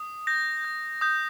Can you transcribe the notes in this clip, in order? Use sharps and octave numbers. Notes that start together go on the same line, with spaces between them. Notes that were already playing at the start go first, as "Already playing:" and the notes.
Already playing: D#6
G6 A#6
G6
D#6 G6